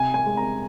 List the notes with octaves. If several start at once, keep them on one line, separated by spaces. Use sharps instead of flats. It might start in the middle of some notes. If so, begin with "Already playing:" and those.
Already playing: C3 G#5
G#5
G#3
A#5